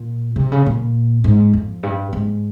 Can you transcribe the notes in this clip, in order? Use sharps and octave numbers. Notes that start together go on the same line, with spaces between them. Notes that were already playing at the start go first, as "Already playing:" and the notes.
Already playing: A#2
C3
C#3
A#2
G#2
F2
G2
G#2